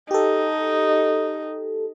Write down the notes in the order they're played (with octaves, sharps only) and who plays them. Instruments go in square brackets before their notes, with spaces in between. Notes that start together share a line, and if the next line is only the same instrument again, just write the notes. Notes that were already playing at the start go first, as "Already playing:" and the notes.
[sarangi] D#4 [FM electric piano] G4 A4